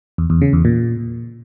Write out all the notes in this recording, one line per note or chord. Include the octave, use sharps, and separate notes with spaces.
E2
E2
C#3
E2
A#2